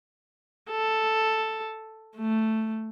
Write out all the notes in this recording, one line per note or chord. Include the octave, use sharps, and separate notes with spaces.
A4
A3